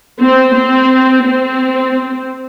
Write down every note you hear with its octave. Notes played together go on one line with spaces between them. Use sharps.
C4
C4
C4